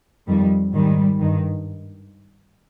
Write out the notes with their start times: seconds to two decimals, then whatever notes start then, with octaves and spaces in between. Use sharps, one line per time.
0.27 F2 D#3 G3
0.73 G#2 D#3 G3
1.19 G2 D#3